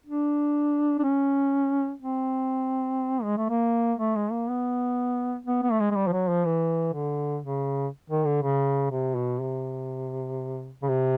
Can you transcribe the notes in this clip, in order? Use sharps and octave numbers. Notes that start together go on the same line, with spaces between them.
D4
D4
C#4
C4
G#3
A3
A#3
A3
G#3
A#3
B3
B3
B3
A3
G#3
G#3
G3
F3
F#3
F3
E3
D3
C#3
D#3
D3
C#3
C3
B2
C3
C#3
C3